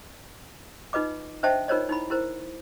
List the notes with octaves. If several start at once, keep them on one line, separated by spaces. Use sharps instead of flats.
D#4 F4 B4 D#5 D6
D4 C5 D#5 E5 G5 A5
D#4 F4 A#4 C5 C#5 D#5
D#4 E4 B5
E4 A#4 C5